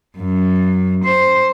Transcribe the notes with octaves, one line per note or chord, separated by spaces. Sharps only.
F#2
C5